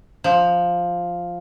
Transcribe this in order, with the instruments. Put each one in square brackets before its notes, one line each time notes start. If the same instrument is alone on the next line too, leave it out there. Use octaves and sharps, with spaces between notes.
[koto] F3